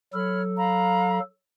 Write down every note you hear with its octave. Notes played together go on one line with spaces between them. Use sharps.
F#3 A4 C#5 B5 F6
F5 A#5 B5